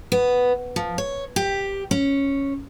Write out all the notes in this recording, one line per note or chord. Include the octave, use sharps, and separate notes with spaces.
B3
F3
C#5
G4
C#4